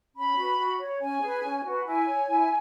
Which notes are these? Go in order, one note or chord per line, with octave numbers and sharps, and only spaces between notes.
C#4 B5
F#4 B4
F#4
C#5
C#4 G#5
G#4 B4
C#4
F#4 B4
E4 G#5
C#5
E4